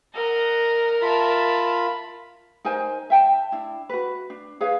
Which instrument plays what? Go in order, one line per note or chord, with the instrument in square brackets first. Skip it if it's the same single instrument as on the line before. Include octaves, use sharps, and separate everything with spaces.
[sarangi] A#4 [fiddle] D#5 F#5
[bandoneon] F4 B5 [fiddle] E5 A5
[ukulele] D#4 A#4 C5 G#5
E5 G5 A5
D4 E4
F#4 B4
D4
G#4 B4 C#5 F5